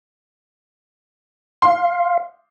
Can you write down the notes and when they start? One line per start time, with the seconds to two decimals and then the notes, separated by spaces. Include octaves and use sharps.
1.62 F5 C6